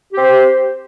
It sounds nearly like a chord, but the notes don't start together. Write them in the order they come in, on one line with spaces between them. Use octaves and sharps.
G4 C4 C5